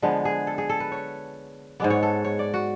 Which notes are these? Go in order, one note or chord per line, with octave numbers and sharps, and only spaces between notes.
D3 F3 G#3 B3
G#4
A4
G#4
A4
B4
C#5
G#2 G#3 B3 D5
C#5
A4
C#5
D5
F#4